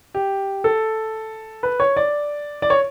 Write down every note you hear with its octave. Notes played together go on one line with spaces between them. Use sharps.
G4
A4
B4
C#5
D5
D5
C#5